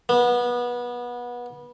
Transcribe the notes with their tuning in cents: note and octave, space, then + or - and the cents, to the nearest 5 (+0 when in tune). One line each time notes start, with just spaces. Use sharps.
B3 -25